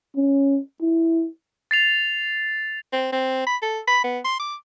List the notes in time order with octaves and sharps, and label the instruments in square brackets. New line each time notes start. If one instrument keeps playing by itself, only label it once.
[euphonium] C#4
E4
[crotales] A6 C7 F7
[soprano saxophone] C4
C4
B5
A4
B5
B3
C6
D6